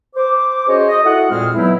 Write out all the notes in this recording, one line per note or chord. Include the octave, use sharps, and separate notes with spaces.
C5 D6
C#4 F#4 G#4 C5 C#5 D#5
D#5
E4 F#4 A4 F#5
F2 A#2 G#3 C4 G#4 F6
E3 F#3 B3 D#4 E4